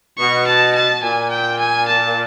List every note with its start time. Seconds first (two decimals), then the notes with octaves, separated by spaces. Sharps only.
0.18 B2 C#6
0.47 A5
0.75 A5
1.03 A#2 G#5
1.30 G5
1.59 G#5
1.88 A5